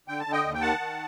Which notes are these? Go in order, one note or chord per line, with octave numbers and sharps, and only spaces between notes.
D3 G5
A5
D3
D#5 G5
D#2
G5
D#3 F#5 A5
D#3